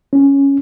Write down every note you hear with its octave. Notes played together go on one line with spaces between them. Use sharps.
C#4